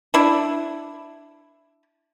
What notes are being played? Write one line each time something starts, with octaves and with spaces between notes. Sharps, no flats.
D4 E4